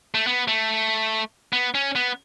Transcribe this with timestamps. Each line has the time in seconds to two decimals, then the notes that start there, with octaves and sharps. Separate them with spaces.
0.14 A3
0.27 B3
0.48 A3
1.53 B3
1.75 C#4
1.96 B3